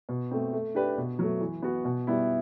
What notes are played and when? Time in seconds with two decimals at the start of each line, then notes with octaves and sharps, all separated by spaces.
0.09 B2
0.31 A3 C4
0.53 A3
0.74 D4 G4 B4
0.97 B2
1.19 F#3 A3
1.41 E3
1.62 B3 F#4
1.85 B2
2.07 G3 B3 E4